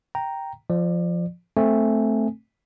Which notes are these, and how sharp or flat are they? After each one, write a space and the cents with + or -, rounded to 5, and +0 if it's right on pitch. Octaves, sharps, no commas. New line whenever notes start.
G5 +0 A#5 +0
F3 -5 D5 +30
A3 +0 C4 +0 G#5 -10